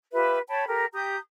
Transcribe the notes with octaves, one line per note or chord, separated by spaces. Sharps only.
F4 G4 B4 E5
C#5 G5 A5 B5
G4 A4 A#4
G4 A#5 D#6 G6